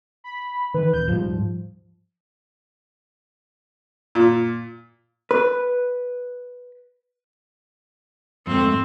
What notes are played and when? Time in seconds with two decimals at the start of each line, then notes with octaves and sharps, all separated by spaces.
0.24 B5
0.74 D#3 E3 B4
0.93 D#1 G6
1.08 D#1 G#2 F3 G3
4.15 A#2
5.31 B4
8.47 F2 G#2 A3 C4